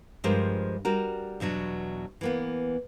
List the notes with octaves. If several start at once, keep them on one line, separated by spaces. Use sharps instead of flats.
G2 F3 G#3 G4 A#4 C5
G3 F#4 A#4
E2 B2 F#3 D4
E3 A#3 B3